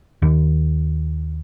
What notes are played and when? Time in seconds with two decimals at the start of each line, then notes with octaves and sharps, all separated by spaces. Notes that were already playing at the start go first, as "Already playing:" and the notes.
0.22 D#2